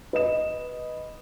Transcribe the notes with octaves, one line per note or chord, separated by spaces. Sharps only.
B4 D#5 E7